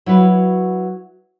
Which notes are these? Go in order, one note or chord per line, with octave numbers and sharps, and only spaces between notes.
F#3 E4 F#4 B4